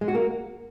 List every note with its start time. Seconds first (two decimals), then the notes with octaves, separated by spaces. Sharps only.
0.01 G#3
0.08 F#4
0.15 A#3